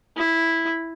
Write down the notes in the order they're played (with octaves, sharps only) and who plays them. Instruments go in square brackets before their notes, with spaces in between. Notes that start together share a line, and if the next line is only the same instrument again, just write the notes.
[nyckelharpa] E4